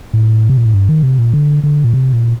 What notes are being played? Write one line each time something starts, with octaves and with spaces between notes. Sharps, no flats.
A2
C3
A#2
A2
G2
D#3
C3
A#2
D3
D3
A#2
C3
A#2